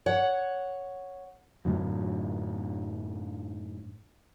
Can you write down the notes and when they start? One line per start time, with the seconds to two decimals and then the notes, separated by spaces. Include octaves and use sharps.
0.06 C#5 F#5
1.65 F#2 A2 D3 F#3